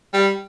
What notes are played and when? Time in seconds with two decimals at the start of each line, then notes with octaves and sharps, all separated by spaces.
0.13 G3